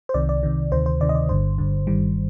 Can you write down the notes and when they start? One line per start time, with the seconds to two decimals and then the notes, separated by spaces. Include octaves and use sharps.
0.09 C5
0.14 C2 C3 D#3 D5
0.29 D5
0.43 C2 C3 D#3
0.72 D2 C3 D#3 C5
0.86 C5
1.00 D2 C3 D#3 D5
1.09 D#5
1.15 D5
1.29 G1 G2 D3 C5
1.58 G1 G2 D3
1.87 G1 G2 D#3 G3